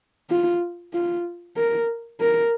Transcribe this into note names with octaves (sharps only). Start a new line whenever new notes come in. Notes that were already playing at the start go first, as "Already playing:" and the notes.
F4
F4
A#4
A#4